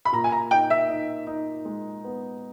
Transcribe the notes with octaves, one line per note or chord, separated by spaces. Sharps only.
B5
A#2 A#5
G#5
A#5
D#4 G5
E5
D#4
D#4
G#3
B3